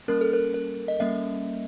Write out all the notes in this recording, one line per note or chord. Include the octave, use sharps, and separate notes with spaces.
G3 A#3 C#4 A#4
A4
A#4
A#4
D#5
G3 A#3 C#4 E5